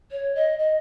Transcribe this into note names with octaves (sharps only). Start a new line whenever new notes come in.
C#5
D#5
D#5